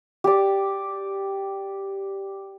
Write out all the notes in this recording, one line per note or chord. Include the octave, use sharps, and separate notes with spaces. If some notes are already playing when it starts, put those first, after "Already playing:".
G4 D5